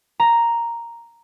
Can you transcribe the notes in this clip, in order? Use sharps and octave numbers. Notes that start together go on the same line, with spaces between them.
A#5